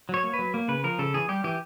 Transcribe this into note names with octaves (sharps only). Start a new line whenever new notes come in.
F#3 C#5
A#3
B4
F#3
A#3
C#3 B4
F3 A#4
C#3 A4
E3 G#4
G3 G4
E3 G4